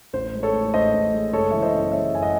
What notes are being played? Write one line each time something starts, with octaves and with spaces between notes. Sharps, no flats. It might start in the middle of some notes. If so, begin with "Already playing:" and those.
A1 C5
G#3
A4 C#5
A2
A1 C5 D#5
A1
G#3
F#1 A4 C#5
E3 E5
C5 D#5
F#2
G#3 C#5 E5
F#1 G#5
D#5 F#5